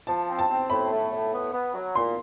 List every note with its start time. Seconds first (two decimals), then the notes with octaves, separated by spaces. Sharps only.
0.07 F3 A5
0.28 C4
0.39 A5
0.48 C4
0.70 A2 B5
0.91 A3
1.11 A2
1.33 B3
1.53 B3
1.74 F#3
1.95 A#2 C6